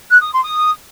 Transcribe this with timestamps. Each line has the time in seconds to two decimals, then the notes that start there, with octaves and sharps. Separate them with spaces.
0.11 F#6
0.22 D#6
0.33 C6
0.44 D#6